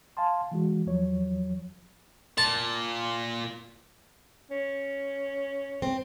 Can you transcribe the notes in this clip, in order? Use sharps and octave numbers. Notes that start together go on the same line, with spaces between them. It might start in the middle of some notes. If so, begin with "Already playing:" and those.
F5 G#5 A5 C6
E3 G#3 F#4
E2 F3 F#3 C#5
A#2 A5
C#4
C4